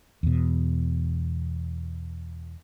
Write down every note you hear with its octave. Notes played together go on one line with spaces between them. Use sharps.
E2 B2